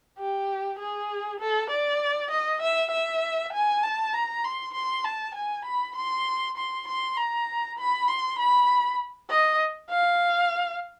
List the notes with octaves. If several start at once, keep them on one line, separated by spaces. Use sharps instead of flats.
G4
G#4
A4
D5
D#5
E5
E5
G#5
A5
A#5
C6
C6
A5
G#5
B5
C6
C6
C6
A#5
B5
C6
B5
D#5
F5